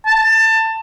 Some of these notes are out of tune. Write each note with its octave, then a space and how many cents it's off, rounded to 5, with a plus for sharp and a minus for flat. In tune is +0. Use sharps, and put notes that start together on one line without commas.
A5 +20